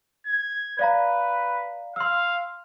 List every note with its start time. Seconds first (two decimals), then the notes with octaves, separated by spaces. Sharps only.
0.26 G#6
0.79 B4 D5 F5 A#5
1.96 F5 C6 E6